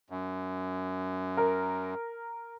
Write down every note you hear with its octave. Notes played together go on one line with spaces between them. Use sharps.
F#2
A#4